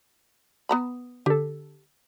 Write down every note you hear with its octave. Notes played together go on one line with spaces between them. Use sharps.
B3 A#5 B5
D3 G4 A4